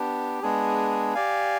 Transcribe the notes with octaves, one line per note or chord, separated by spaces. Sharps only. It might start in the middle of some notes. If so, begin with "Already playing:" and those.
Already playing: B3 D4 G4
G#3 B3 D4 G#4
G4 D5 F5 G#5